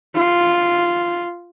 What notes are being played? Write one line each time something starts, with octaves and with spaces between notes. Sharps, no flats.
F4